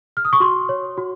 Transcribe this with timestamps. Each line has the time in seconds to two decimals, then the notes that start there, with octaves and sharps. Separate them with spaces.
0.17 F6
0.25 D#6
0.33 C#6
0.40 F#4 C6
0.69 C#5
0.98 F#4